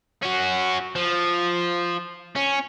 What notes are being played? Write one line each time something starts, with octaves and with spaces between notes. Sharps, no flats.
C#4 F#4
F3
C#4